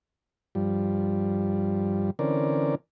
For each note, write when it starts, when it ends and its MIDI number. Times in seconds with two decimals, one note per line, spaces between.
0.55 2.10 43
0.55 2.10 53
0.55 2.10 55
2.19 2.75 50
2.19 2.75 52
2.19 2.75 60
2.19 2.75 61
2.19 2.75 70
2.19 2.75 74